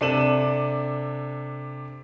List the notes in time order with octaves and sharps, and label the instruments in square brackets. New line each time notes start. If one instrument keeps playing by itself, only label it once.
[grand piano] C3 D4 A4 D#7 E7 F#7